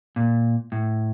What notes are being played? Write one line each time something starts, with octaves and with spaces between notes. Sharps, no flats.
A#2
A2